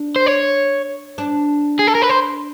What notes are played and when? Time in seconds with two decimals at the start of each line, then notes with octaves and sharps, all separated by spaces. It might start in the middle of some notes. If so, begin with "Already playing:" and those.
Already playing: D4
0.16 C5
0.26 C#5
1.18 D4
1.79 G#4
1.87 A4
1.95 A#4
2.02 B4
2.09 C5